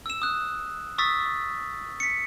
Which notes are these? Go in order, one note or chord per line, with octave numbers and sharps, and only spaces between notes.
E6 E7
D#6 F#6
C#6 D#6 E6 A6 B6
B6 C#7